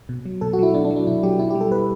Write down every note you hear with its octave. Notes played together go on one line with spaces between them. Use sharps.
B2
F#3
B2 A4
F#4
F#3 E4
B2 D4
D4
F#3
D4
B2 E4
F#3 G4
B2 E4
G3 G4
A4
B2 B4